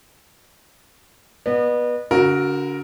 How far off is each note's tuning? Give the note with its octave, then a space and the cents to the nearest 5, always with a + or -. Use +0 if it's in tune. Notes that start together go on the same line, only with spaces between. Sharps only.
B3 -20 D#5 -45
D3 -45 F#4 +0 A#4 +0